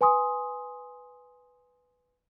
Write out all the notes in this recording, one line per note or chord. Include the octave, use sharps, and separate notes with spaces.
B4 G#5 C6 D#6